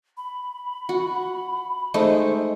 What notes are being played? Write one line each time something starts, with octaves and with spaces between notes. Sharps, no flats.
B5
F#4
G#3 A3 D#4 C5